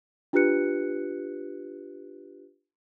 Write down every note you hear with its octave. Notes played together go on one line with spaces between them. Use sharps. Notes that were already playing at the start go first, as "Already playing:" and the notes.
D4 F4 G4 B4 F#6 C#7